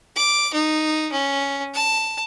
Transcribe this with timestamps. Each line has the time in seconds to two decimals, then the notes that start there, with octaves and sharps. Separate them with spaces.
0.16 D6
0.53 D#4
1.12 C#4
1.74 A5